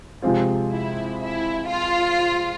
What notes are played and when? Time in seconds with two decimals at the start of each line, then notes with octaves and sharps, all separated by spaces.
0.22 C3 F3 G#3 C4 F4
0.72 E4
1.20 E4
1.69 F4